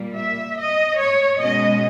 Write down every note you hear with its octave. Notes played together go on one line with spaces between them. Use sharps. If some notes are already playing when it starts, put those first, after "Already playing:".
Already playing: A#2 G3 A#3
E5
D#5
C#5
B2 G#3 C#4 D#5